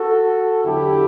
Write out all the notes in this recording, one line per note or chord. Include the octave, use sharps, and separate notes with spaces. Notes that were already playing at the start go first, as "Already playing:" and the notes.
Already playing: F#4 A4
E2 D3 F#3 E4 G4